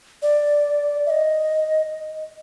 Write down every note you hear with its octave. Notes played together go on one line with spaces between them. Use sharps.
D5
E5
D#5